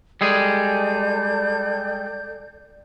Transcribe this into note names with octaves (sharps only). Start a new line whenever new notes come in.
G3 G#3 G#4 A4 D5 G6